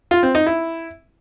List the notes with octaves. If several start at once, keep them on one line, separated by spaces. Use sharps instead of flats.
F4
C4
D#4
E4